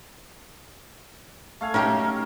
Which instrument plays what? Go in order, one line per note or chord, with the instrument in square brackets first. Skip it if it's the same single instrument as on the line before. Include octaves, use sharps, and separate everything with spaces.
[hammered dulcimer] A3 F5 G#5
[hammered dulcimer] F#3 E5 [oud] C#4 D#4 G4 [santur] A#4 F5